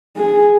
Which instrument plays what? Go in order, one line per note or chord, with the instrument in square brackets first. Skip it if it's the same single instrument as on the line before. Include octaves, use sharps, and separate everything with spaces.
[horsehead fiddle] G#4